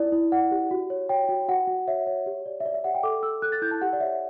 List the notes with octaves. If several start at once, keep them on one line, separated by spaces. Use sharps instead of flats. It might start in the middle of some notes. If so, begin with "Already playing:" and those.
Already playing: E4 D5
E4
D5 F#5
G4
F#4
C#5
C#5 G5
F#4
F#4 F#5
F#4
C#5 E5
C#5
G4
D5
E5
D5
E5
G4 F#5
G5
A4 D6
A4 E6
A4 F#6
A6
E4 G6
A5
G4 F#5
D5
C#5 E5